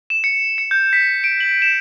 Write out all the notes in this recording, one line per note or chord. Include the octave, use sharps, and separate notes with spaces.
E7
C#7
C#7
G6
B6
D7
F#7
E7